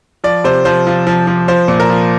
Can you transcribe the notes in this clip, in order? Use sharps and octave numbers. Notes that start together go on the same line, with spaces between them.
F3 D5
C3 C5
F3 C5
F3
F3
F3
F3 C5
A#2
A#4
F3